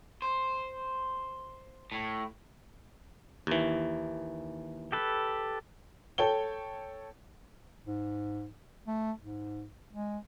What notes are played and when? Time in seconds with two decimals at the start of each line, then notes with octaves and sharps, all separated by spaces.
0.22 C5
1.92 A2
3.47 D#2 E3
4.92 G4 A4 B4
6.18 A4 C#5 G5 G7
7.87 G#2
8.87 A3
9.21 G#2
9.93 G#3